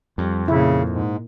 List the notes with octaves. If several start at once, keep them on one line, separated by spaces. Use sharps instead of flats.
F2 G3
A#2 C#3 E4
G#2